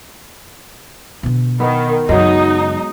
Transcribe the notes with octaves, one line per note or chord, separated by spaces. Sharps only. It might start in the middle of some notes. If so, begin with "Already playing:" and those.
B2 D3
D#3 B3
F#2 C#3 F#3 G#3 D#4